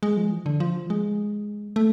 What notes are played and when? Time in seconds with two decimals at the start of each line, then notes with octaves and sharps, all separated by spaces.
0.03 G#3
0.17 F3
0.31 E3
0.46 D3
0.60 F3
0.90 G#3
1.76 A3